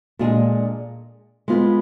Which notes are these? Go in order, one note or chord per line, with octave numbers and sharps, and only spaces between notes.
A#2 G#3 D4 G#4
G#3 B3 F4 B4